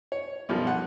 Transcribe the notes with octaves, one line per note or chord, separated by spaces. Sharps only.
C#5
B1 F#2 F3 G3
F#5